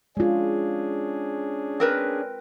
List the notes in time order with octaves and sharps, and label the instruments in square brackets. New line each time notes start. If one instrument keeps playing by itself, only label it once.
[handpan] G#3 F4 [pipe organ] C#4 D4 G#4
[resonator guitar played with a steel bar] C4 A#4 B4